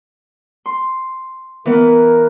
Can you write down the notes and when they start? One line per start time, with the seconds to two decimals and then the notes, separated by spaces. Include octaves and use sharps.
0.66 C6
1.66 E3 B3 A#4